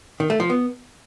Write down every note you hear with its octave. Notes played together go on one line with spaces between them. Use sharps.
D#3
A3
F3
B3